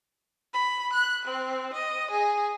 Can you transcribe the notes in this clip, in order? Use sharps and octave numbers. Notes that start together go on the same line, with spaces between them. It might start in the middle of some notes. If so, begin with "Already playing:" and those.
B5
F#6
C4
D#5
G#4